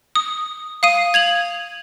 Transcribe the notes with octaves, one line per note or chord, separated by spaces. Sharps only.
D#6
F5 D#6 D#7
G#6 F7 F#7